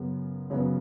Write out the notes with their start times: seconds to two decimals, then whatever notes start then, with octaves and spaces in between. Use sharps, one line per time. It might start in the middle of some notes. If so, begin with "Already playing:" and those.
Already playing: F#2 C#3 F#3 B3
0.50 F#2 C#3 F#3 B3